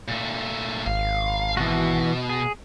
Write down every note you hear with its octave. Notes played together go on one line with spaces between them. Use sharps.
A#2 A3
G#1 F5
B2 E3 F#4
G#4